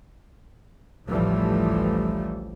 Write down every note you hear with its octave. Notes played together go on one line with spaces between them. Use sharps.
A1 D2 E3 F3 G3 A3